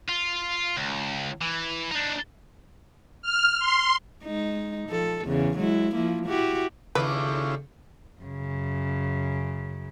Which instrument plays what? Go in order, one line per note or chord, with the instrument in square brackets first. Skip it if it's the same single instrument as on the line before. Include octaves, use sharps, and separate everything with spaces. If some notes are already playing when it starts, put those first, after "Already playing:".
[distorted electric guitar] F4
C#2
E3
D4 D#4
[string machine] F6
C6
[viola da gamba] G#3 D#4
F3 A4
E2 C#3
F#3 G#3 E4
F3 A#3 E4
E4 F#4 G4
[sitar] D#2 A3 D5 [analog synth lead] C#3 [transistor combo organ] C#4 E4 F4 [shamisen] B4
[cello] F#2 C#3